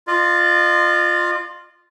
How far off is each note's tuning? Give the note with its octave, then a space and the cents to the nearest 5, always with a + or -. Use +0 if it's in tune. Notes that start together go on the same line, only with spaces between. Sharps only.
F4 +0 D#5 -45